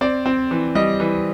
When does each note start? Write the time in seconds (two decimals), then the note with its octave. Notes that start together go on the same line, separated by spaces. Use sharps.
0.01 C4 D5
0.26 C4
0.51 E3
0.75 G3 D#5
1.00 E3